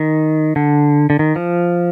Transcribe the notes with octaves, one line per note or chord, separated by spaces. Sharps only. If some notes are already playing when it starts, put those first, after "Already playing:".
Already playing: D#3
D3
D3
D#3
F3